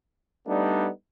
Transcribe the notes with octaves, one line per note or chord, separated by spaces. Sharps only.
G3 A3 B3 D4 D#4